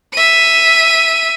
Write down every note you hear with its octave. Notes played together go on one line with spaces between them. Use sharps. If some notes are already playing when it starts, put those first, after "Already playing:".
E5 D#7